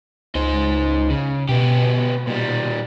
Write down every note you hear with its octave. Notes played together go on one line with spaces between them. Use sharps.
C#2 D#4 C5
C#3
B2 B3 G4
A#2 G3